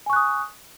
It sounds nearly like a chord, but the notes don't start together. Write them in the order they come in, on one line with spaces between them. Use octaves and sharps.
G#5 C#6 F#6 D#6